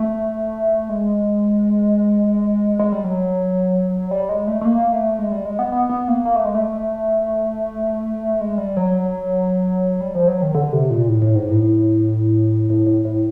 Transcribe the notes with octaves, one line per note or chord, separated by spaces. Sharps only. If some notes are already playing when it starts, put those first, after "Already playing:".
Already playing: A3
G#3
G#3
G3
F#3
G3
G#3
A3
A3
A#3
A3
G#3
G3
G#3
B3
B3
B3
A#3
A#3
A3
G#3
A3
G#3
G3
F#3
G3
F3
F#3
D#3
D3
C3
A#2
A2
A2
G#2
A2
A2
A2
A2
A2